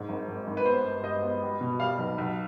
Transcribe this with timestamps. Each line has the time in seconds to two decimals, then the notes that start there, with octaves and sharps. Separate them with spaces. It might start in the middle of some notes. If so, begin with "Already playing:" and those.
Already playing: G#2
0.09 G#1
0.28 G#1
0.47 G#1
0.57 B4
0.65 B3 C5
0.84 G2
1.03 G2 D#5
1.23 B3
1.42 G3
1.61 B2
1.79 G3 F5
1.98 B1
2.18 B1